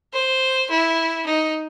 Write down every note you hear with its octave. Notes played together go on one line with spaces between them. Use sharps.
C5
E4
D#4